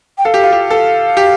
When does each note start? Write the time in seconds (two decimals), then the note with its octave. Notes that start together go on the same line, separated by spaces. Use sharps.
0.18 G5
0.25 A4 F5
0.34 G4
0.43 F4
0.52 G4
0.71 A4
1.17 G4